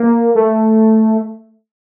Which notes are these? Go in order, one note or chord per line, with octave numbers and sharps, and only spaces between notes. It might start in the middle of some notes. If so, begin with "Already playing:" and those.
Already playing: A#3
A3